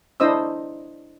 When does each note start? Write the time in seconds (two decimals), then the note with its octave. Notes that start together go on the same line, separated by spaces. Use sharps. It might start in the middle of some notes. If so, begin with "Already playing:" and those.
0.20 D4 E4 C5 D#5 D#6 E6